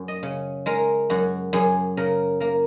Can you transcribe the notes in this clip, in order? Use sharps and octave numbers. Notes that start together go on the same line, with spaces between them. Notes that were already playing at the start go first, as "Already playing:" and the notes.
Already playing: F#2
D#5
C#3
G#3 A#4
F#2 F#4
F#2 G#4
C#3 A#4
A#3 A#4